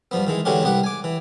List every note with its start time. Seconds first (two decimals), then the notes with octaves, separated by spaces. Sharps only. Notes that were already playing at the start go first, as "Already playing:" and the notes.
0.11 G2 F3 B3
0.27 D#3 E3 G#3
0.45 D3 E3 G#3 C#4 F#4 G4
0.63 C2 B3 G4 F#5
0.83 G#5 D6
1.04 E3